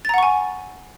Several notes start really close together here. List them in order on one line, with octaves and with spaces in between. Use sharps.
A6 A#5 F#5 C#6 G#5